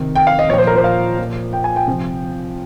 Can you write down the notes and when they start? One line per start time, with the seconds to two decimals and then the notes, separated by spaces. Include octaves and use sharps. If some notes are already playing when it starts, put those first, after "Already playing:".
Already playing: C3 D#3
0.16 G5
0.27 F5
0.39 D#5
0.49 A#2 C#5
0.53 F3 C5
0.67 A#4
0.76 C5
0.84 F5
1.18 A#2 F3
1.53 G5
1.64 G#5
1.76 G5
1.88 C3 F3